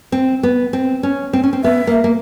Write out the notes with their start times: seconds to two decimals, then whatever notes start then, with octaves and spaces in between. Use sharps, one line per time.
0.12 C4
0.43 B3
0.73 C4
1.03 C#4
1.33 C4
1.44 C#4
1.53 C4
1.64 B3 E5
1.87 A#3
2.04 A#3